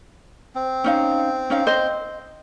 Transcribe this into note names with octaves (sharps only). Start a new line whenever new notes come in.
C4
C#4 D#4 F5
C#4 D#4 F5
C5 D#5